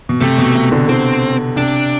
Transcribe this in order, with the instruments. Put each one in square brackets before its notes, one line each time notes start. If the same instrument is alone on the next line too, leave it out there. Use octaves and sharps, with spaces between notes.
[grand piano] B2
[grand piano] C3 [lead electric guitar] A3
[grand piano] B2
C3
D3
[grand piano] D3 [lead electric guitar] C4
[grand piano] C3 [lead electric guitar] D4